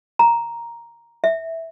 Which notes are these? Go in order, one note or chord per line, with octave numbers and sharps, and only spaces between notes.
A#5
E5